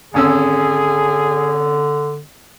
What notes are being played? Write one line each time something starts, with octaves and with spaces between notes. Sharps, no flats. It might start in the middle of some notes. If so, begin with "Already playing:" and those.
G#1 D3 C#4 G#4 E6